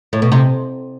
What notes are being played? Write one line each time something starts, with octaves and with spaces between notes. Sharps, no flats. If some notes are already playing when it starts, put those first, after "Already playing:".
A2
B2
C3